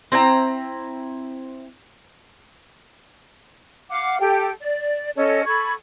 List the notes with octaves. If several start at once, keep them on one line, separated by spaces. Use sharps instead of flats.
C4 E4 G5 A#5
F5 F#5 D6
G4 A4 G5
D5
C#4 A4 C#5 D#5
A4 B5 C#6 G#6